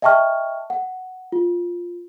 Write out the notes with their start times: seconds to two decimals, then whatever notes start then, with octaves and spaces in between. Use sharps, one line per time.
0.02 D#5 E5 G5 A5 C#6 F6
0.70 F#5
1.32 F4